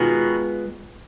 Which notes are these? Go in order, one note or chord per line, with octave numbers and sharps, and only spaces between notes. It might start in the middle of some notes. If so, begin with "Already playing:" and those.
Already playing: B2 D#3 G#3 B3 F4 G#4